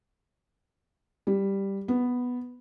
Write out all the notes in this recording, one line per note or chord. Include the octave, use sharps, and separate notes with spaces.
G3
B3